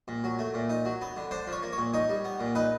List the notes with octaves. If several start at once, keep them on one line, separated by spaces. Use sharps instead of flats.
A#2
F#3
A3
A#2
D#4
F#3
B3
D3
D4 C5
F3
C#5
A#3
C#5
A#2
D#4 C#5
G3
B3
A#2
D#4 B4